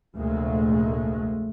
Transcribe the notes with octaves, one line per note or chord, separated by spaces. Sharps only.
F1 D2 A#2 G#3 A3